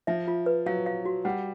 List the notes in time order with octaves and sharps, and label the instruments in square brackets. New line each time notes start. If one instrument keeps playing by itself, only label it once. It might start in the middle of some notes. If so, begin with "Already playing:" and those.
[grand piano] F3 [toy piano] E5
[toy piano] F4
B4
[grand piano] F#3 [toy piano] F5
[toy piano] F5
F#4
[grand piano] G3 [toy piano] F#5